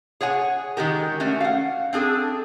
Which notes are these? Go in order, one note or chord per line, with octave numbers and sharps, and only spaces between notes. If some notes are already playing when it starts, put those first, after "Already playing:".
G#4 C#5 F#5 G#5
D#3 G#3 G4 A#4
A3 C#4 D4 F#4
F5 F#5
C4 D4 G#4 A4